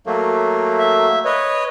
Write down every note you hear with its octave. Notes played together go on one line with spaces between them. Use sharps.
F#3 A3 A#3
E5
B4 C#5 D#5